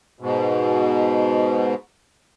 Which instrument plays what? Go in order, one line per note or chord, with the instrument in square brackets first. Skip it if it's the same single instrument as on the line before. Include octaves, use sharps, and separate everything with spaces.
[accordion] G#2 B2